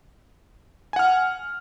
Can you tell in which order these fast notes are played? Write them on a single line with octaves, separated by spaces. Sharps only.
G#5 F#5 F6